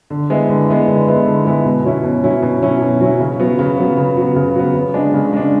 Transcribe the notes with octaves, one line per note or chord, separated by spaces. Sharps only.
D3
G#3 B3 E4
D3
G#3 B3 E4
D3
G#3 B3 E4
D3
G#3 B3 E4
B2
F#3 C#4 E4
B2
F#3 C#4 E4
B2
F#3 C#4 E4
B2
F#3 C#4 E4
C#3
F#3 B3
C#3
F#3 B3
C#3
F#3 B3
C#3
F#3 B3
C#3
G#3 D4
C#3
G#3 D4